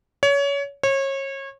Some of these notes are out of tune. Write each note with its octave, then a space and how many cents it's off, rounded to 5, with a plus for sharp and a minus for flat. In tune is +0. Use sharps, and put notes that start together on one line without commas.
C#5 +25
C#5 -30